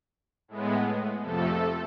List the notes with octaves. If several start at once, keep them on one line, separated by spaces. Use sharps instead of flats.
A2 G#3 B3
F2 C3 F3 A3 A4